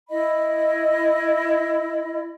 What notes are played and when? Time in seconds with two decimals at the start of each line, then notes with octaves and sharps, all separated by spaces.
0.09 E4 D#5 B5